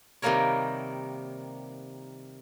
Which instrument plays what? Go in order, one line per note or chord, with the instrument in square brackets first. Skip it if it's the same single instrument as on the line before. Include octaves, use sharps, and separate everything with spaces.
[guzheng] C3 D#3 G3 A#3 A#4 C#5